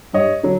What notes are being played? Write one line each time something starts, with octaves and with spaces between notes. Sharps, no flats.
G2 C#5 D#5
D3 F#3